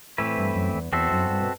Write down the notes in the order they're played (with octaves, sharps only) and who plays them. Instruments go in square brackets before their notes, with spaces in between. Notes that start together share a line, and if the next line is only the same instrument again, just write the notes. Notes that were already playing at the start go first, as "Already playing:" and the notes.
[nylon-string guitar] A2 [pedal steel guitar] E3 A3 C4 E4 B4
[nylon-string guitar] G2
F#2
E2
[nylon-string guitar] E2 [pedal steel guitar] C4 F#4 A4 C5 E5
[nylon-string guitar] F#2
G2
B2